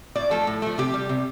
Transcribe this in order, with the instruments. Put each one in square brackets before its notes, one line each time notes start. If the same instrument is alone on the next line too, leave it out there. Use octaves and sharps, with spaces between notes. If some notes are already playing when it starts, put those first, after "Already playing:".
[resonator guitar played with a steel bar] A2 D5
F3 A3 A4
A2
F3 A3
C3 G4
G3
C3